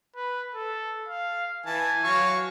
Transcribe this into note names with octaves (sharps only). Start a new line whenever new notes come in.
B4
A4
F5
E3 G#5 A5
F#3 F5 C#6